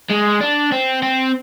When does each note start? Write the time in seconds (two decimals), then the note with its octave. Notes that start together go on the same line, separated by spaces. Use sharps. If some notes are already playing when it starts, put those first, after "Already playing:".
0.10 G#3
0.40 D4
0.72 C4
1.03 C4